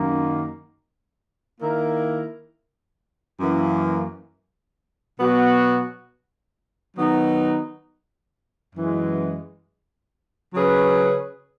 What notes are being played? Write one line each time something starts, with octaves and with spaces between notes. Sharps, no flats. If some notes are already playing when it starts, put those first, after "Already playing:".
Already playing: F#2 D#3 A#3
D#3 A#3 E4 A#4
F#2 E3 A#3
B2 F#3 B3 F#4
D#3 F#3 B3 D#4
F#2 E3 G#3
C#3 F#3 C#4 G#4 B4